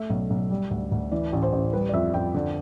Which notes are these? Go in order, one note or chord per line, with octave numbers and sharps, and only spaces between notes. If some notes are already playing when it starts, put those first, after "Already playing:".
Already playing: A3 E5
B1
B1
G3
D2
D2
E3 D5
A1
C5
A1
G3 B4
D5
F2 E5
F2 G5
D3